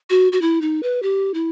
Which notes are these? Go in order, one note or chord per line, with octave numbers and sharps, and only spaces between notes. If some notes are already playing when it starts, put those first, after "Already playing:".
F#4
F#4
E4
D#4
B4
G4
E4